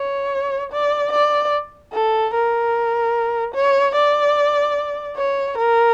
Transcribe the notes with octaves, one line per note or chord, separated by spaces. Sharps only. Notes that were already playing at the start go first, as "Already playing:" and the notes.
Already playing: C#5
D5
D5
A4
A#4
C#5
D5
C#5
A#4